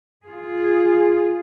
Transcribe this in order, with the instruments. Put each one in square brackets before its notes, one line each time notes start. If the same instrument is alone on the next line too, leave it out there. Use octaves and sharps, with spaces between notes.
[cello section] F4 G#4